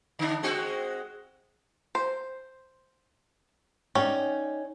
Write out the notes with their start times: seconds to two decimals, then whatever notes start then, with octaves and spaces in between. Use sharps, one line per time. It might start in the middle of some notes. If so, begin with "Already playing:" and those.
0.19 D3 D4
0.43 G#3 C4 F#4
1.95 C5
3.95 C#4 D#4 D5 G5